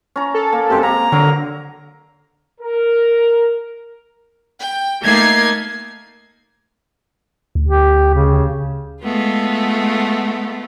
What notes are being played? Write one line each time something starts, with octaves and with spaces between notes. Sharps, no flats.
C#4 A#5
A4
A#3
F#2 C3 G#3 G4
A#3 A#5
D3 F#3 A#4
A#4
G5
A3 A#3 D#4 G#6 C7
D2
G4
C#3
G#3 A3 B3 F4